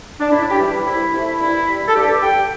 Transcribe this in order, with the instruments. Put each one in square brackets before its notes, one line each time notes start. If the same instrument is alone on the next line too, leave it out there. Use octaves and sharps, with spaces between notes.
[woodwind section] D4
A2 E4
G4
E3 G3 E4
C2 E4
C3 A3 E4
G2 E4
G3
A4
G2 G4
D3 G3 G5